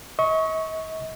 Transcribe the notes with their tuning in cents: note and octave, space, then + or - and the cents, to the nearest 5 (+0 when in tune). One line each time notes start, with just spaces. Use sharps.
D#5 +45 C#6 +0